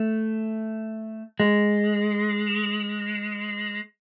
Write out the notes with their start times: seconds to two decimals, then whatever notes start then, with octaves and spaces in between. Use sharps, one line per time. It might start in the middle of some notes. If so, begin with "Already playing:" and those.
Already playing: A3
1.40 G#3